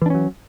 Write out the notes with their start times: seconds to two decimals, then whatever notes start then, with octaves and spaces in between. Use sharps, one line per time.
0.02 E3
0.06 D4
0.10 C#4
0.15 F#3